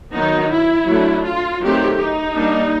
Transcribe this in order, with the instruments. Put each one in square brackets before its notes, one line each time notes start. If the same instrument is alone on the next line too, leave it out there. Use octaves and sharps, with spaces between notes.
[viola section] D#3 F#3 B3 D#4
E4
F#3 A3 D4
F4
D#3 F#3 A3 C4 G4
D#4
G3 A#3 D4